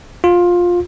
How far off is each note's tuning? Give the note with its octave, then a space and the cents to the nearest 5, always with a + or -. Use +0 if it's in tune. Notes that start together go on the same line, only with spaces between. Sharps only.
F4 +15